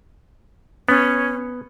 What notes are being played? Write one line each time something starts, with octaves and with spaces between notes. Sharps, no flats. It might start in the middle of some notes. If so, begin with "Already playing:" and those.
B3 C#4